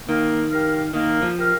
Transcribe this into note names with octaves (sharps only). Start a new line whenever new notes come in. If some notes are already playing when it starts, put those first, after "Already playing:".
D#3 A#3
G4 A#4 F5
D#3 A#3
F3
G4 A#4 F5